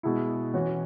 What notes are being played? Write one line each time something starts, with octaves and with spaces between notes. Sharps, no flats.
B2 G#3 E4
E3 C#4 F#4